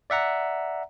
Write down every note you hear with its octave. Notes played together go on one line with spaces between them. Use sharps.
D5 E5 F#5 A#5